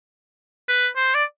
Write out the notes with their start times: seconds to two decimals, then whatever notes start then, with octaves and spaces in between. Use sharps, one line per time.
0.68 B4
0.96 C5
1.14 D5